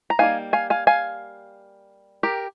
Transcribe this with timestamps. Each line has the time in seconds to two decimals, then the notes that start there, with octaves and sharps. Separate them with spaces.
0.10 A#5
0.19 G3 A#3 D#4 F5 G#5
0.53 F5 G#5
0.70 F5 G#5
0.87 F5 G#5
2.23 G4 A#4